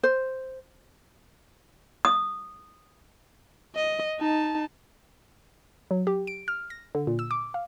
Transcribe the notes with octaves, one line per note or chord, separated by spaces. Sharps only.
C5
D#6
D#5
D#4 A5
F#3
G4
D7
F6
A#6
D3
A#2
E6
D6
F5